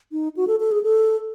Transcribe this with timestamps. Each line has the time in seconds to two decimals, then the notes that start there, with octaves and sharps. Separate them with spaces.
0.12 D#4
0.37 F#4
0.47 A4
0.60 A4
0.71 G#4
0.83 A4